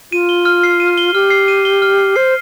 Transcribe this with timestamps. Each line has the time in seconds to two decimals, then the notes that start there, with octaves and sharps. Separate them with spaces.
0.12 F4 D#7
0.29 G7
0.45 F6
0.63 C7
0.80 D#7
0.98 G7
1.14 G4 F6
1.30 C7
1.48 D#7
1.65 G7
1.82 F6
1.99 C7
2.16 C5 C7